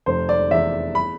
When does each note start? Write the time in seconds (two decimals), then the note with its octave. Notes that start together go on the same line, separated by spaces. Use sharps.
0.06 F1 C5
0.29 D5
0.51 E2 E5
0.95 B5